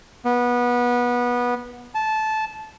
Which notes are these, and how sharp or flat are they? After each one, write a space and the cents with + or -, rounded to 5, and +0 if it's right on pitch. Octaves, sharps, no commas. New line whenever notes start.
B3 -20
A5 -15